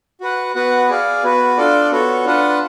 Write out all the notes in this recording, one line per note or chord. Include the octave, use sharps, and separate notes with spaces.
F#4 B4 F#5
B3 F#4 B4 F#5
G#4 D5 F5
B3 F#4 B4
D4 F4 A4 D5
B3 F#4 A4 C#5
D4 F4 B4 F#5 A5